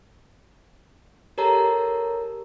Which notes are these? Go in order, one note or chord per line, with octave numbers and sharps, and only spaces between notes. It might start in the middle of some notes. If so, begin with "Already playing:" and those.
G4 A4 A#4 C#5 A5 A#5